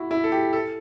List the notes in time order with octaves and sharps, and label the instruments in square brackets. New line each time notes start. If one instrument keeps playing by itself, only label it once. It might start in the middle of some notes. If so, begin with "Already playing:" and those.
Already playing: [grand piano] E4 F#4
E4
A4
G4
A4